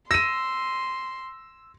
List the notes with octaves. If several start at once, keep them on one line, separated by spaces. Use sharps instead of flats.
C6 E6 A#6 D#7